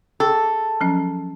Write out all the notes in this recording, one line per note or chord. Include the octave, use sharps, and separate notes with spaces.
G#4 A4 G5 E6
F3 F#3 C#4